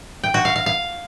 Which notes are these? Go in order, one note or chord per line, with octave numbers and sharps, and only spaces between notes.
G5
F#4
F5
F5
F5